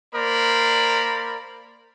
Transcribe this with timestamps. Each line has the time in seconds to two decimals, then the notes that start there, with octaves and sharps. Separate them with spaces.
0.15 A#3 A#4 C5 D5 B5